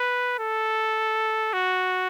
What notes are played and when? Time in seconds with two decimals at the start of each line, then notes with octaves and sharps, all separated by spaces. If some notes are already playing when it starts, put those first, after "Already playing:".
Already playing: B4
0.39 A4
1.53 F#4